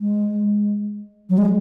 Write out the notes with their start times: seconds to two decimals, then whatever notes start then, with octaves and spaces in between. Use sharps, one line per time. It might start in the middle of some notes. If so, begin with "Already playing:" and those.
0.01 G#3
1.30 F#3
1.38 G#3